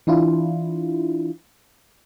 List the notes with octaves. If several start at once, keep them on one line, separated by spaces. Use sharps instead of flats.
E3 D4 E4 F4